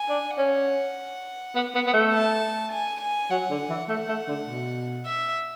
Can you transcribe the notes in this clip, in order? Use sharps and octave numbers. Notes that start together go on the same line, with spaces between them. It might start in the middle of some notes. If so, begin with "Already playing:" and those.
Already playing: G#5
D4
C#4 F#5
B3
B3
B3
A3
A5
G#5
G#5
F#3 F#5
D3
E3
A3 F#5
A3
D3
B2
E5